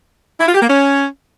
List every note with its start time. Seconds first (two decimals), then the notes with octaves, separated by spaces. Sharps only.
0.40 E4
0.47 F4
0.54 G4
0.62 A#3
0.69 C#4